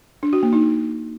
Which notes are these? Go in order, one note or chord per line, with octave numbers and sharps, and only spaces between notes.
D4
F#4
A#3
D#4